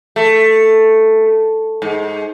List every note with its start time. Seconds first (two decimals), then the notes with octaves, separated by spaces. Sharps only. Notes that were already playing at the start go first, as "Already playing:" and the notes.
0.16 A3
1.82 G#2